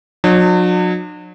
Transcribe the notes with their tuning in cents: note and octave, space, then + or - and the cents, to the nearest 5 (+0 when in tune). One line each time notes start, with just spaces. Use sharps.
F#3 -35 D4 +45